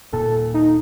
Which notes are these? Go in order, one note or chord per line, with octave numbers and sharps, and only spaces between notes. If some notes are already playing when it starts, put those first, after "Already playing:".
D#1 A#2 A4
D#4